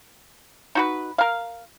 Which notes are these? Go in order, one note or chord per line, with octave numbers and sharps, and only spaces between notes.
D#4 F#4 B4
A#4 F5